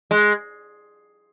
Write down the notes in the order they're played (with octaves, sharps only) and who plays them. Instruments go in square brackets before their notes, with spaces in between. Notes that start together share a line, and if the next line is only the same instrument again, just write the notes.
[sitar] G#3